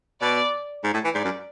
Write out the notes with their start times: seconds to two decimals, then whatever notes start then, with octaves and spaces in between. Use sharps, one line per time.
0.21 B2 D5
0.84 G#2
0.94 A2
1.04 E3
1.14 G#2 D5
1.24 F#2